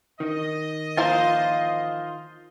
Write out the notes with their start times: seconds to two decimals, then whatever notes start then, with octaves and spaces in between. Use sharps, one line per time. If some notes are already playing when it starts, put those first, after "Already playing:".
0.20 D#3 D#5
0.97 E3 F3 A#3 F4 C5